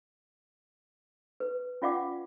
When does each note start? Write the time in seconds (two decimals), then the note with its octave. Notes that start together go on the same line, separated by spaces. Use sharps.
1.40 B4
1.82 C#4 F4 D5 F5 F#5 D6